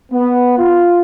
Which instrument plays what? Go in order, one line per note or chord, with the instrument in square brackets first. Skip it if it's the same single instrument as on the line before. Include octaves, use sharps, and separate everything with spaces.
[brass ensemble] B3
F4